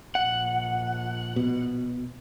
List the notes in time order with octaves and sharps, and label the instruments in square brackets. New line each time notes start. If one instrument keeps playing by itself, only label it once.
[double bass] A#1 [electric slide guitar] F#5
[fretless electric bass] B2